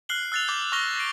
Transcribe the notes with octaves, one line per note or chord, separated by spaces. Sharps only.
F6 F#6 C7 F#7 G7
E6 F#6 A6 C7 F7
D6 G6
C#6 F6 A#6 F7 G7
A#6 C7 D7